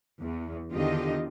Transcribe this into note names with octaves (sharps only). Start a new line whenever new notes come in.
E2
E2 D3 D#3 F4 G4 D#5